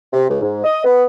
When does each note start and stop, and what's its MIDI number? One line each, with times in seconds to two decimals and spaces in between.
0.13 0.28 48
0.30 0.40 37
0.42 0.64 44
0.64 0.83 75
0.85 1.05 59